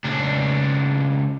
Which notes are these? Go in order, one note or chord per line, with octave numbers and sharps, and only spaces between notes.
C#2 D4